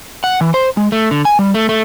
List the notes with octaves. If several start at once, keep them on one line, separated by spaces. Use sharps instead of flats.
F#5
E3
C5
G#3
A3
D3
G#5
G3
A3
A3